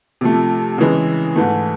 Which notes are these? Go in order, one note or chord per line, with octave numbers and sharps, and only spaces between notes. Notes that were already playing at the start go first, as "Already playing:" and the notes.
C3 F3 A3
C#3 E3 G#3
G#2 E3 A3